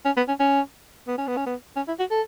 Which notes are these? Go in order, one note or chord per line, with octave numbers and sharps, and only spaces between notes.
C#4
B3
C#4
C#4
B3
C#4
B3
C#4
B3
C#4
E4
F#4
A4